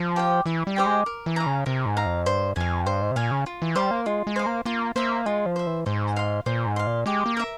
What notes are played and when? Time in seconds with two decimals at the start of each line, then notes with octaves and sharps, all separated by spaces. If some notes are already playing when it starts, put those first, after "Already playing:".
Already playing: F3
0.16 G4 C5 G5
0.46 E3 E4
0.67 G3
0.76 G4 C5 G5
0.86 G#3
1.06 A#4
1.26 E3
1.36 F5 A#5
1.46 C#3
1.66 C3 A#4
1.86 G#2
1.97 F5 A#5
2.06 F2
2.26 G2 C5
2.56 F2 F5 G#5
2.86 G2 C5
3.02 G#2
3.11 C3
3.16 A#2 F5 G#5
3.31 C#3
3.46 F4
3.62 E3
3.76 G3 C5 F5
3.91 A#3
4.06 G#3 F4
4.27 G#3
4.36 C5 F5
4.46 A#3
4.66 A#3 F4
4.96 A#3 C5 E5
5.26 G#3 F4
5.46 F3
5.56 C5 E5
5.67 E3
5.86 G#2 C5
6.16 F5 C6
6.46 A#2 C5
6.66 G#2
6.76 F5 C6
6.87 A#2
7.06 G#3 G4
7.26 A#3
7.37 A#4 E5